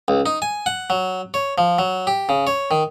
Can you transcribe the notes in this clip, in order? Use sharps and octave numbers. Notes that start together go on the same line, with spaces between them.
C#2
D#4
G#5
F#5
F#3
C#5
F3
F#3
G4
C#3
C#5
D#3